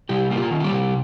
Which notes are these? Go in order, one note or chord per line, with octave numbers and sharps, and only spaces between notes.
C3 G3 G4
A#3 G4
F4
D#3
F4
G3 G4
C3